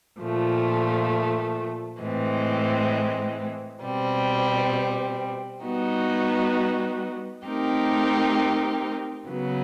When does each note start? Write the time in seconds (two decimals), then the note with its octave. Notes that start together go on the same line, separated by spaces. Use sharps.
0.21 A#2 F3 A3
2.02 A2 E3 G#3 C4
3.83 B2 G3 C4
5.65 G3 B3 D#4 F#4
7.48 A3 C4 D#4 G4 A#4
9.29 C#3 F#3 B3